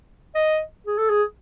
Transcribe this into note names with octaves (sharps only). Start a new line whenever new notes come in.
D#5
G#4
A4
G#4